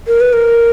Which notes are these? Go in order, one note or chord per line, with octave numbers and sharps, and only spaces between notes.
A#4
B4
A#4